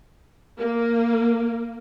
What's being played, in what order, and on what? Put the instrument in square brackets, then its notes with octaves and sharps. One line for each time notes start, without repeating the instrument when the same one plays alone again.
[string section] A#3